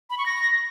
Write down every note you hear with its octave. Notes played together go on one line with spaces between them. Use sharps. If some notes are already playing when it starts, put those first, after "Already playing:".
B5
C#6
A#6